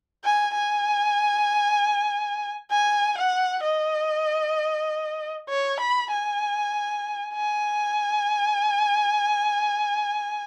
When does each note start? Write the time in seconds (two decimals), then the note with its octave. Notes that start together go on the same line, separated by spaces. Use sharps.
0.24 G#5
0.54 G#5
2.70 G#5
3.17 F#5
3.63 D#5
5.49 C#5
5.80 B5
6.11 G#5
7.34 G#5